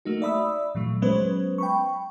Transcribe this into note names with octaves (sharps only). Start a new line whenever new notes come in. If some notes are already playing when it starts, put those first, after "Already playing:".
A3 A#3 D#4 F#4
D5 E5 B5 D#6 E6
A#2 E3 F#3 A3
F#3 G#3 B3 C#4 B4 C5
G5 B5 C#6